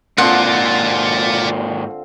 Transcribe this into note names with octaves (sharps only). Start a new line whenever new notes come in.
G#2 D3 F3 A#3 C4 F4 D5 F#5